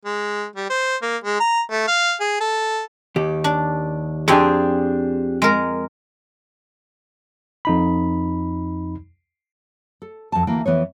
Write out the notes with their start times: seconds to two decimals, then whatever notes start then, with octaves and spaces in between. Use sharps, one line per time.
0.06 G#3
0.56 G3
0.70 C5
1.02 A#3
1.24 G#3
1.40 A#5
1.71 A3
1.87 F5
2.20 G#4
2.40 A4
3.16 D#2 G4
3.44 D4
4.28 F2 C4 D4 G4 G#4 G#5
5.42 G#3 A#4
7.65 F2 D#4 B5
10.02 A4
10.32 F2 A5
10.47 D2 E3 A#3 E4 G5
10.66 F2 E3 B3 C#5